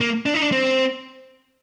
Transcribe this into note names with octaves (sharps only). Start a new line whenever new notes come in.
A#3
D4
D#4
D4
C4